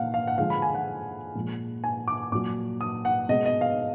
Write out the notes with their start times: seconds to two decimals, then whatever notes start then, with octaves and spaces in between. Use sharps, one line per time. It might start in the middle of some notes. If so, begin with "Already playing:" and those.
Already playing: A#2 F5 F#5
0.14 F5
0.27 F#5
0.38 D3 F3 G#3 F5
0.50 B5
0.62 G#5
0.74 F#5
1.35 A#2 F3 G#3
1.84 G#5
2.08 D6
2.32 A#2 F#3 D6
2.81 D#6
3.05 F#5
3.29 B2 G#3 D#5
3.45 D#5
3.61 F5